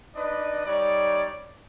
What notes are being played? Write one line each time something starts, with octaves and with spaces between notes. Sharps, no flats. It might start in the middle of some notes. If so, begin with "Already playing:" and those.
D4 D#4 B4 D5 D#5
G3 D#4 C#5 D5